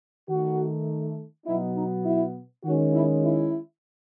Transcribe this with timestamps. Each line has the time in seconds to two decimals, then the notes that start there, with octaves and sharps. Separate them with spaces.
0.29 D#3 A3 D#4 F#4
1.46 B2 F#3 B3 D#4 E4
1.75 D#4
2.05 E4
2.64 D#3 G#3 C#4 F#4
2.93 E4
3.23 E4